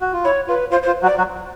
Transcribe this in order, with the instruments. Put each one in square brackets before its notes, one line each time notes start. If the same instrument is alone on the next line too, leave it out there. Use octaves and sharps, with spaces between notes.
[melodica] F#4
F4
[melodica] E4 [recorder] C#5
[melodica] F4 [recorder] B4
[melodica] F4 [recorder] C5
[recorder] C5
[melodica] F4
F#3 F#4
[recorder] D5
[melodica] F#3 F#4